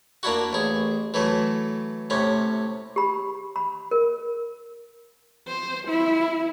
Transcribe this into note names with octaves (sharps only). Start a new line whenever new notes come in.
A#3 D4 E4 F#4
A1 G#4
E3 F#3 A3
A2 C3 C#4
G4 B5
B5
A#4
C5
E4